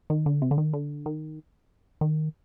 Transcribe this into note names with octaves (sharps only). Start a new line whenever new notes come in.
D#3
D3
C3
D3
D#3
D3
D#3
D#3